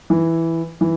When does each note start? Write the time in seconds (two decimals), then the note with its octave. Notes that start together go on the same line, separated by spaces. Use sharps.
0.10 E3
0.81 E3